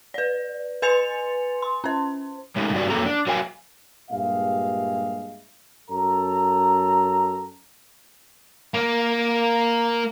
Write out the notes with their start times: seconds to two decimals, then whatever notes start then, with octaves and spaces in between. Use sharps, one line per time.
0.14 B4 D5
0.82 B4 G#5 C6 A6 C#7 F7
1.62 C6
1.84 C#4 C5
2.56 C#3 G#3 A3 D#4
2.72 G2 C#3 G3 D#4 F#4 D5
2.90 F2 F#3 A#3 A4 A#5
3.05 D4
3.27 F#3 A#4 F5 G#5
4.10 G2 A#2 G#3 G4 E5 F5
5.90 F#2 A4 A#5
8.74 A#3